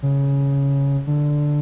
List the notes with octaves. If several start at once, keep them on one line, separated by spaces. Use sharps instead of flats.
C#3
D3